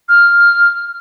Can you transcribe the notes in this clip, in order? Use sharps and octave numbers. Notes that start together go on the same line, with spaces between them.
F6